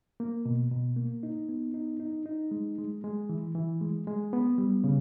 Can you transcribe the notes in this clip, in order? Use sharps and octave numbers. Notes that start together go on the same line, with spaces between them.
A#3
B2
B2
A#3
D#4
B3
D#4
D#4
D#4
G#3
G#3
G#3
E3
E3
G#3
G#3
B3
G3
C#3